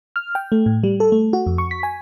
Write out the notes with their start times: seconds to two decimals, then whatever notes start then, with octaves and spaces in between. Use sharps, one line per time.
0.16 F6
0.35 G5
0.52 A3
0.66 A2
0.84 G3
1.00 A4
1.12 A3
1.33 F#4
1.46 F2
1.58 C#6
1.71 B6
1.83 G#5